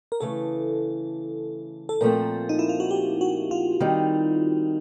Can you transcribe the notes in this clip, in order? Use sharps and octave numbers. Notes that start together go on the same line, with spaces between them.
A#4
C#3 E3 A3 A4
A4
A#2 F3 A3 C4 A#4
D#4
E4
F4
F#4
G4
F#4
F4
D#3 G3 C4 D#4